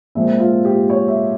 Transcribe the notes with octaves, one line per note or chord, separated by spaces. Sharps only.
A#2 F3 G#3 C4 E5
F4
G4
C#5
E5